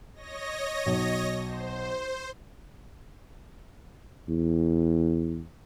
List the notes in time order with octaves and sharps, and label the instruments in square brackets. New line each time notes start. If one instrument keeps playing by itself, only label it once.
[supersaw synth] C#5 D#5 A#6
[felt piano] B1
[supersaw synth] C5
[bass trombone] E2